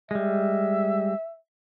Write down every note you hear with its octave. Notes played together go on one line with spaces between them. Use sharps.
G3 G#3 E5